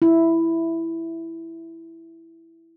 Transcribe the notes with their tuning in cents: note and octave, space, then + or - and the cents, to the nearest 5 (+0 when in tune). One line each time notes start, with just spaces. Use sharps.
E4 +0